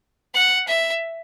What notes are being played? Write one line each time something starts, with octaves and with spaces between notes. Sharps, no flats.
F#5
E5